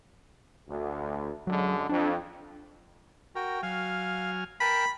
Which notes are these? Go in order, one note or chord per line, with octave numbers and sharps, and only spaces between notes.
D2
F#2 D3 F#3 G#3
F2 D4
F#4 A#4 G5
F#3 F5 G#5 F6
A#4 G5 A5 B5